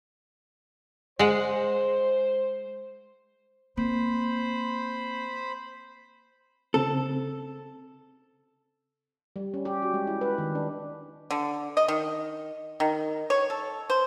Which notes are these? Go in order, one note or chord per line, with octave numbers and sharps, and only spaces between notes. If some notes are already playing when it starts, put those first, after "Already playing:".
G#3 C5 F#5
A#3 C4 C5 B5
C#3 C4 A4
G3
C#4
G4
F#4
G#3
E4
B4
D#3
D4
D3
D#5
D#3
D#3
C#5
A4
C5